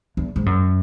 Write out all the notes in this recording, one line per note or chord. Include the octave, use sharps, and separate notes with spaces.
E2
G#2
F#2